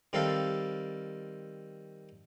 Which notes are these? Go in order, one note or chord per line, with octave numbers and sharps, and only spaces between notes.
D#3 G3 C4 A4 E5 F5